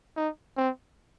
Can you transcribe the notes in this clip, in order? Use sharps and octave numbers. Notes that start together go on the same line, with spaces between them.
D#4
C4